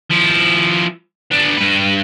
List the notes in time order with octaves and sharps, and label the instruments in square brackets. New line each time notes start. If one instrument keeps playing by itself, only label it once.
[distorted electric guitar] F3 E4
B3 D4
G2 B4